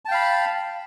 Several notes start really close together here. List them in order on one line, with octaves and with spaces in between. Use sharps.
A5 G5 F5 B5